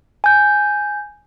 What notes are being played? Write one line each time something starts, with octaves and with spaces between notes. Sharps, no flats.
G#5 G6